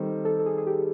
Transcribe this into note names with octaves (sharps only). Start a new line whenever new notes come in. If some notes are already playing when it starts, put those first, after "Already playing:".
Already playing: D#3 G3 C4 A4
A4
A4
G#4
G#4
G4